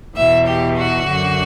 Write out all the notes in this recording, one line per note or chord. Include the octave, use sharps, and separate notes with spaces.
E2 B2 E5
G4
F#4
F#2 D3